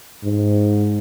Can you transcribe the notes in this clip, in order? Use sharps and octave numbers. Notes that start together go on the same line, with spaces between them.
G#2